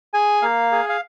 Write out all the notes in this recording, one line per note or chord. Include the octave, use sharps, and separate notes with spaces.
G#4 G#5
A#3 F5
G#4
F5